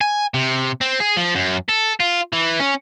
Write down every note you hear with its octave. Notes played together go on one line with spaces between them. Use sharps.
G#5
C3
C4
G#4
F3
F#2
A4
F4
E3
C#4